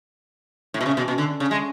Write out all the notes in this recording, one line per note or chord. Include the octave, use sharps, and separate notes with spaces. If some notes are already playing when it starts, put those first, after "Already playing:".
A2
B2
C#3
B2
B2
D3
C#3
G#3